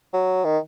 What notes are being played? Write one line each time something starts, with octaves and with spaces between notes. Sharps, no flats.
F#3
D#3